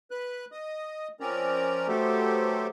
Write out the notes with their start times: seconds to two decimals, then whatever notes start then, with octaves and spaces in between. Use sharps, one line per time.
0.11 B4 F#6
0.52 D#5 D#6
1.20 F3 C4 C#4 A#4 D5 A#5
1.88 F#3 A3 B3 G4 A4 C5